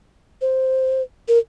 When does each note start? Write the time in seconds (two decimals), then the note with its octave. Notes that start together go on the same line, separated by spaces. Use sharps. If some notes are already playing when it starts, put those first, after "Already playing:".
0.41 C5
1.28 A#4